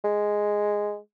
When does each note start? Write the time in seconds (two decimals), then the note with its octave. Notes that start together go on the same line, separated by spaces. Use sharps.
0.04 G#3